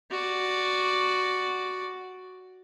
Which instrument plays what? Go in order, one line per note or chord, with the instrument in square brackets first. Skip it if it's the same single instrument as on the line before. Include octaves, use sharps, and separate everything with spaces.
[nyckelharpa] F#4 D5